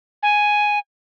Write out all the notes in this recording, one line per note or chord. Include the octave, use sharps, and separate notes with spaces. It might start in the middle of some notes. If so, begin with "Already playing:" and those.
G#5